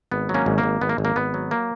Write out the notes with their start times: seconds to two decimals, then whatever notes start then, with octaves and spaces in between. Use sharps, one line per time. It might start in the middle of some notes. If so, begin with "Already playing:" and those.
0.12 G#1 B3
0.29 F#3
0.34 A#3 C#4
0.46 G#1
0.58 A#3
0.63 G#1
0.81 G#1 B3
0.89 A#3
0.98 G#1
1.05 A#3
1.16 G#1 B3
1.34 F#3
1.51 A#3